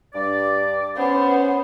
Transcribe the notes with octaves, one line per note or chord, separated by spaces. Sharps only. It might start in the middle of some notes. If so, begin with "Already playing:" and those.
G2 D5 D6
B3 C#4 C5